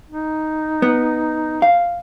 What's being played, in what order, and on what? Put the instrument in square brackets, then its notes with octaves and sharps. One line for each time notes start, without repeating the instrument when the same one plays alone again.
[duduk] D#4
[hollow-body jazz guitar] B3
F5